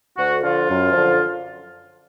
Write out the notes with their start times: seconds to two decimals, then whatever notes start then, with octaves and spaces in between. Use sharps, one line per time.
0.17 D2 F#4
0.42 D3 F3 F4
0.68 F#2
0.93 D3 F3